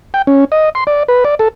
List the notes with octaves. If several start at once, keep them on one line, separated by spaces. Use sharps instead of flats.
G5
C#4
D#5
C6
D5
B4
D5
A4